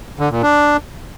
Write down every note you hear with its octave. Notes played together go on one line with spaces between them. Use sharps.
D3
A#2
D4